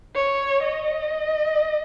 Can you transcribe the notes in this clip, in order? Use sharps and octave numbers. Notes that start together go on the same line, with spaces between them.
C#5
D#5